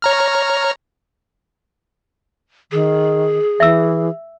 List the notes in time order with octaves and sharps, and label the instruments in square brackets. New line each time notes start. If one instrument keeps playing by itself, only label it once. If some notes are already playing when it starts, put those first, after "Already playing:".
[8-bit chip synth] C#5 A#5 F6
[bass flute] D#3 [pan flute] G#4
[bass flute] E3 [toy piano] E5 E6